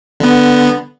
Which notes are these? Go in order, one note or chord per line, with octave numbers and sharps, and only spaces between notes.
D3 B3